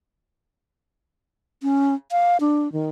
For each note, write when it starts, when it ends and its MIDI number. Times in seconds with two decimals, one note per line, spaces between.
1.63 1.94 61
2.11 2.37 77
2.40 2.71 62
2.73 2.90 51